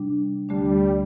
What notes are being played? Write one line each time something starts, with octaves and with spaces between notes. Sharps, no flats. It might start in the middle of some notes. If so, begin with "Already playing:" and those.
Already playing: C3 G3 D4
D2 D3 G3 A3 D4 G4